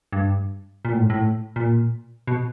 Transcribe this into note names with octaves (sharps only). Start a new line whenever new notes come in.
G2
A#2
A2
G#2
A2
A#2
B2